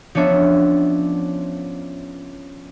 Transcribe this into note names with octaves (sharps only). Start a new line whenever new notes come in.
F3 B3 C#4 D4 C#5 E5